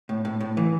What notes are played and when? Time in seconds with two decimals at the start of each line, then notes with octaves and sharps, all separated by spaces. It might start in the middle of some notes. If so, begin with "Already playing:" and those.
0.09 A2
0.25 A2
0.40 A2
0.57 E3